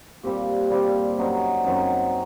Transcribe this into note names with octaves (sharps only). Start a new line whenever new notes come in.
A#2 G3 C4 G4
A#2 G3 C4 G4
F#2 F#3 C4 D#4
F#2 F#3 C4 D#4